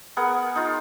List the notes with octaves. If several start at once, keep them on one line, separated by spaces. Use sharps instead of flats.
B3 G#4 A#4 F#5
D#4 F4